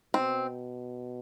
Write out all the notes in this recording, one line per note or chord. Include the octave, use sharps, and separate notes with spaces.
B2 C4